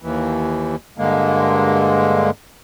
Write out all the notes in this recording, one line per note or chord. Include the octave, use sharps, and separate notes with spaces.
D#2 E3
G2 D3 G#3 A#3